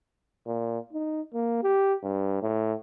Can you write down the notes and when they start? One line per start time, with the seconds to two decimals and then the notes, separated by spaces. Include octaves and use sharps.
0.47 A#2
0.93 D#4
1.34 A#3
1.63 G4
2.03 G2
2.42 A2